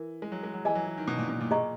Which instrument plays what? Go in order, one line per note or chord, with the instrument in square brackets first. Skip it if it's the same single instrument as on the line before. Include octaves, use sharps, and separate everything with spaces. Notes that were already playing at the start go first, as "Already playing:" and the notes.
Already playing: [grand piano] E3 [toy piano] A#4
[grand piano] G#3
F#3
G#3
F#3
[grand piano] E3 [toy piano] G#4 D#5 G#5
[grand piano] F#3
E3
D#3
B2
A#2
B2
A#2
[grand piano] A#2 [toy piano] G#4 D#5 A#5 C#6